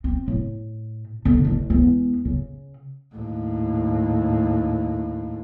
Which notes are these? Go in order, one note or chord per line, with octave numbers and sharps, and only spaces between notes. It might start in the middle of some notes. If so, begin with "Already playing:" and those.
C4
A2
D3 D4
A1 D4
E2 G#3
C#3
D#2 A2